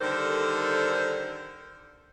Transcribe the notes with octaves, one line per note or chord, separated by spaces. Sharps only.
D3 D#3 G3 A4 A#4 C5